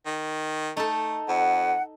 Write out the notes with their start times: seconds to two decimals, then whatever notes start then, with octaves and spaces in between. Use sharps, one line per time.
0.05 D#3
0.77 A3 D#4 A4
1.28 F2 F#5